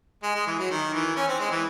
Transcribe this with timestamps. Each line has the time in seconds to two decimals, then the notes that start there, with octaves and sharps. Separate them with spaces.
0.23 G#3
0.35 G#3
0.47 E3
0.59 F#3
0.70 D#3
0.93 E3
1.16 C#4
1.28 C4
1.39 G#3
1.51 E3